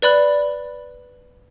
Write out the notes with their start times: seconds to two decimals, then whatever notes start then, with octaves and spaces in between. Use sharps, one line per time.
0.02 B4 D5 B5 F#6